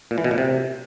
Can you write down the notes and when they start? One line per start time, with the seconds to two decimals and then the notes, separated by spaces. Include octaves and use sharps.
0.11 A#2
0.18 E3
0.24 B2
0.31 A#2
0.38 C3